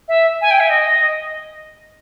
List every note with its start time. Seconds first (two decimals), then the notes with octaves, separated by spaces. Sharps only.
0.08 E5
0.41 G#5
0.51 G5
0.60 E5
0.70 D#5